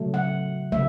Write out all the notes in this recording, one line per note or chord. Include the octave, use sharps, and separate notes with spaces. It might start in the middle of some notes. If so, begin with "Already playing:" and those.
Already playing: C#3 F#3 A3
F#5
C#3 F#3 A3 E5